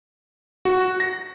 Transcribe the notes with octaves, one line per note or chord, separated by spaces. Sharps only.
F#4
A#6